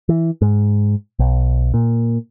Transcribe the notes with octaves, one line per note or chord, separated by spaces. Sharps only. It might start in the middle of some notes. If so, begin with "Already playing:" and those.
E3
G#2
B1
A#2